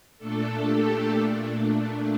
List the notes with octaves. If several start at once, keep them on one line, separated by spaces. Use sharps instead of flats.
A#2 A3 D4 A4
G4
A#2 A3 D4